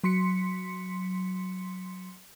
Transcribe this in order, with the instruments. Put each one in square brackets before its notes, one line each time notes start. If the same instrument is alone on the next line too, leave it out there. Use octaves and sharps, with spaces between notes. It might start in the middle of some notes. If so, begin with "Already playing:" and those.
[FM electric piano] F#3 C6 B6 C#7